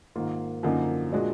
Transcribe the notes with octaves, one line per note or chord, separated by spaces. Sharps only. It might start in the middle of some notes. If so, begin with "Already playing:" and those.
G#2 D#3 A#3 F4
F#2 D3 F3 A#3 D#4
A#2 G#3 D4 F#4